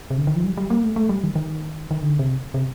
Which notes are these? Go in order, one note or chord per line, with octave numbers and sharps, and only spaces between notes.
C3
D3
D#3
F3
G3
G3
A#3
A3
A3
G3
D#3
D#3
D#3
D3
C3
C3